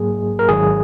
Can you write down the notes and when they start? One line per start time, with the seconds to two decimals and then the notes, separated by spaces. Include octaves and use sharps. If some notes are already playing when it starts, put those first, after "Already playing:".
Already playing: G#2 F#3 A#3 G#4
0.39 A#4
0.48 G#1 G#2 D#3 F#3 G#4